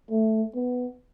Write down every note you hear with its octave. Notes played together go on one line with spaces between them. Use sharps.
A3
B3